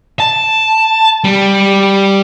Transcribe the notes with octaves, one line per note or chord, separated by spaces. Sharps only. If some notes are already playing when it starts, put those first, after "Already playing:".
A5
G3